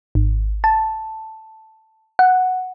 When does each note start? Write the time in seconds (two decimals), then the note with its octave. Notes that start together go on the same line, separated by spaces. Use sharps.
0.15 G#1
0.64 A5
2.19 F#5